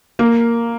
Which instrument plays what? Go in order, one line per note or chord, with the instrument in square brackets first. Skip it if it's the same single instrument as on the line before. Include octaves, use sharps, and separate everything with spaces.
[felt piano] A#3